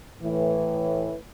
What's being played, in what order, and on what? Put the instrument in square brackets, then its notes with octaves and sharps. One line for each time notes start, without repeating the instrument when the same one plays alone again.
[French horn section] A2 E3